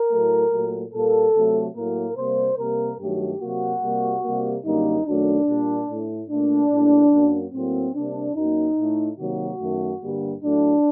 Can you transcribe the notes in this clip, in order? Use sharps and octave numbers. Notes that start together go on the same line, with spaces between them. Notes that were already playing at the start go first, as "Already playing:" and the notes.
Already playing: A#4
A2 F#3 A3
A#2 F#3 A3
A#2 G3 A#3 A4
C3 F#3 A3
A2 F#3 A#3 A#4
C3 G3 A#3 C5
C3 G3 A#3 A#4
G2 D#3 F#3 A3 G4
C3 F#3 A#3 F#4
C3 G3 A#3
C3 G3 A#3
F#2 D3 G3 A#3 D#4
F#2 D#3 F#3 A3 D4
A#2 G3 A#3
A2 A3
A#2 A3 D4
A2 G3 A#3
F#2 F#3 A#3
A2 F#3 A#3 C4
C3 G3 A#3 D4
F#2 F#3 A#3 D#4
A2 A3
C3 D#3 F#3 A#3 F#4
F#2 D#3 A3
G2 D3 G3 A#3
A2 F#3 A3 D4